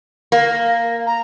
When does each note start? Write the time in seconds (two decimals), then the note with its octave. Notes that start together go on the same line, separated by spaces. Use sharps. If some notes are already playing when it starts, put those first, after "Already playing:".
0.32 A#3
1.06 A#5